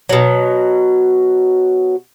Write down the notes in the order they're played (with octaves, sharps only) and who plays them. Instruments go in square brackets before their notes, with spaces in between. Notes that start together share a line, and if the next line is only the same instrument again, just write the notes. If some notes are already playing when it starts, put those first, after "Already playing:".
[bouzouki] B2 F#3